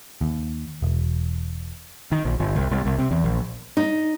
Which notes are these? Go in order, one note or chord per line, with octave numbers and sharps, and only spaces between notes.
D#2
E1
D#3
A#1
G1
C2
C2
C2
C3
E2
A#1
D#4